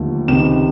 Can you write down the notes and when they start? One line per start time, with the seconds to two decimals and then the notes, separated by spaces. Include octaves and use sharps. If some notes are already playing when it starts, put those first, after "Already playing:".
Already playing: D#2 D3 F3 A3
0.28 C#2 C3 D#3 E7